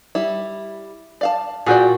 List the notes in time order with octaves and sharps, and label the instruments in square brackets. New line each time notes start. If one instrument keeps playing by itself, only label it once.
[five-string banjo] G3 E4
D5 F5 A5
[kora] A#2 F#4 G5 [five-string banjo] G#4 D5